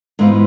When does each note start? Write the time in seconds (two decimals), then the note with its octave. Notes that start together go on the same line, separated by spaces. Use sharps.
0.19 G#2 E3 B3 F4